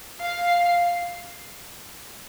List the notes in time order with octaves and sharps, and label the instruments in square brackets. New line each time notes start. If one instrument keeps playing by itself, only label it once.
[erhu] F5